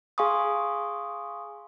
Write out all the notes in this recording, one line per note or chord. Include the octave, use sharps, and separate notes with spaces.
G#4 F5 G#5 C6 C#6 D#6